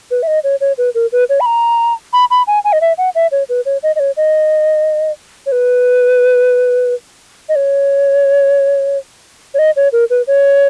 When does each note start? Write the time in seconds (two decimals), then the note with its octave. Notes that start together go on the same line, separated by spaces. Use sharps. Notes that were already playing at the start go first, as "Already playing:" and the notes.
0.11 B4
0.23 E5
0.27 D#5
0.44 C#5
0.61 C#5
0.78 B4
0.95 A#4
1.12 B4
1.29 C#5
1.40 B5
1.46 A#5
2.13 B5
2.31 B5
2.47 G#5
2.65 G#5
2.73 D#5
2.81 E5
2.98 F#5
3.15 E5
3.31 C#5
3.49 B4
3.66 C#5
3.83 D#5
3.96 D#5
4.00 C#5
4.17 D#5
5.46 C#5
5.52 B4
7.49 D#5
7.56 C#5
9.54 C#5
9.59 D#5
9.76 C#5
9.92 A#4
10.10 B4
10.27 C#5